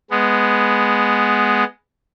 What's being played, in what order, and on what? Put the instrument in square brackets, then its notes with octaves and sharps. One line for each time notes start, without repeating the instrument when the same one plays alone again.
[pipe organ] G#3 B3